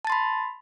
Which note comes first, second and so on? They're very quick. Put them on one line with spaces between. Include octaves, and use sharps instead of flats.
A5 A6 C6 B5